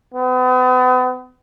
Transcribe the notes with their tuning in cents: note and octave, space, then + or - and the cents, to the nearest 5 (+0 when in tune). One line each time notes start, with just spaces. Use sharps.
B3 +40